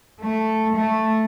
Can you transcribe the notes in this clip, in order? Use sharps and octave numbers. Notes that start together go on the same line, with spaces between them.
A3
A3